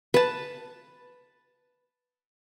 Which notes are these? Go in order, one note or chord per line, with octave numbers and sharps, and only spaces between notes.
B4 A5